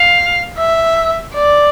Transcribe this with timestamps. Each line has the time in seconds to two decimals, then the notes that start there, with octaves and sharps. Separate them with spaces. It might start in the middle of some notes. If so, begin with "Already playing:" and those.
Already playing: F5
0.58 E5
1.34 D5